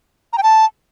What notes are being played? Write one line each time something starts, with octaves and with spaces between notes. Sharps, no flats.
A#5
G5
A5